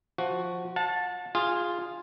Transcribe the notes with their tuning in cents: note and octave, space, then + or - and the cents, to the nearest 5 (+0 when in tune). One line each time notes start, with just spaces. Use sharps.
F3 +10 F#4 +0
F#5 -40 A5 +0
F4 +0 G#4 -15